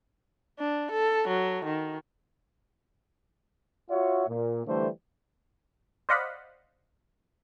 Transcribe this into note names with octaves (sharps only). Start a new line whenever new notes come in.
D4
A4
F#3
D#3
F4 F#4 C#5 E5 F#5
A#2
D3 E3 G3 A3 C5
C5 D5 D#5 F5 F#5 B5